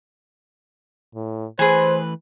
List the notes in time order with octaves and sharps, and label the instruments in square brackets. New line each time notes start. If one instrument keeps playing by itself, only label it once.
[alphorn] A2
[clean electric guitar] E3 A3 B4 [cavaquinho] G#4 G#5 [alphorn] C5